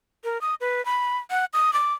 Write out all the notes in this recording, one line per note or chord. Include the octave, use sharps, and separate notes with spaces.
A#4
D#6
B4
B5
F#5
D#6
D6